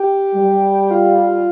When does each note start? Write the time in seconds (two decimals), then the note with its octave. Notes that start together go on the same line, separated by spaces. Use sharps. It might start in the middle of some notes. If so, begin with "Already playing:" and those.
Already playing: G4
0.35 G3
0.91 F4